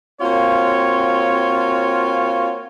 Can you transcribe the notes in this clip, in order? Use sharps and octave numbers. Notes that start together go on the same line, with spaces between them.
A#3 C4 F4 F#4 C#5